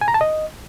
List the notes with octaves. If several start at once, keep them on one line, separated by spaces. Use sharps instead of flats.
G#5
A#5
A5
D#5